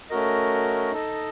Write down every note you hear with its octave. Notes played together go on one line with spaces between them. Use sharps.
A3 C#4 F#4 A#4 D#5
D#4 A4 D#5